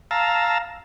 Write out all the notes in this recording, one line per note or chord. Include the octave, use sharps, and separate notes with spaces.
F5 A5 A#5 E6